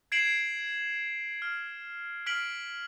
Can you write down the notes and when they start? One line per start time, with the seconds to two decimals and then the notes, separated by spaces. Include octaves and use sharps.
0.12 G#6 C7 D7 E7 F#7
1.42 F6
2.26 F6 B6 D7 F#7